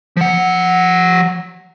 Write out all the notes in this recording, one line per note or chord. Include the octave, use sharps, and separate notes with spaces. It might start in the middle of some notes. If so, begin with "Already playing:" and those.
F3 F#5